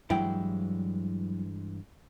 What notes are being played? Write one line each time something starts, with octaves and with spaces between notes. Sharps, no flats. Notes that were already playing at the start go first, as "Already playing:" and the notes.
G2 E3 F#3 G#3 E4 G5